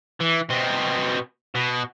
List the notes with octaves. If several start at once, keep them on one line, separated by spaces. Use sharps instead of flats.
E3
B2 C4
B2